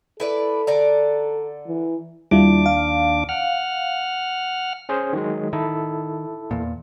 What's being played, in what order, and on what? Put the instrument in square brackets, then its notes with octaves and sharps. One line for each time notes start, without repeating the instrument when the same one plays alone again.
[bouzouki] E4 B4 D5 [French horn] A4
[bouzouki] D3 D5 A#5
[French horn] E3
[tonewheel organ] D#2 D4 D6 [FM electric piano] G3 E4 F4
[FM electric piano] F5
[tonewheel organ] F#5 F6
[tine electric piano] C#4 G#4 C5
D#3 F#3 G#3
[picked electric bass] D#3 [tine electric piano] E4 A4
[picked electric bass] E2 A#2